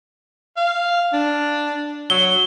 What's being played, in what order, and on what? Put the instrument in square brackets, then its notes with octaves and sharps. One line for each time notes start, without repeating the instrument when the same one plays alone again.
[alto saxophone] F5
D4
[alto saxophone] F#3 [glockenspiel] G7